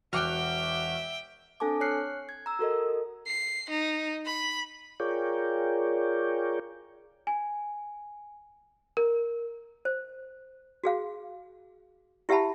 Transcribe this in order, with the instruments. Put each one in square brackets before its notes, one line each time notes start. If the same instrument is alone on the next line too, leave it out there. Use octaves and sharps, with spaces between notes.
[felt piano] E1 D6 F#6 [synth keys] F#4 F6 [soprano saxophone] E5 [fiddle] G5
[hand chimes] C4 D4 A4 G#5 A5 D6
C#5 F6 F#6 C7 C#7
G#6
A#5 E6
F#4 A4 A#4 D#5
[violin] C7
D#4
B5
[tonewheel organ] F4 G#4 A#4 C#5 D5 G5
[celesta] G#5
A#4
[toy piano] C5
F#4 G#4 F5
E4 G4 E5 F#5 A5 B5